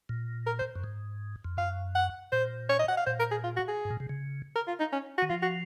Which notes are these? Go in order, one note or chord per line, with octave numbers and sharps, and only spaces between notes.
A#2
A#4
C5
F#2
G#2
F2
F#2 F5
F#5
A#2 C5
C#5
D#5
F#5
F5
A#2 C5
A#4
G#4
F4
F#4
G#4
G#2
A#2
C3
C#3
A#4
F4
D#4
C#4
F#4
D#3
F3 F4
F#4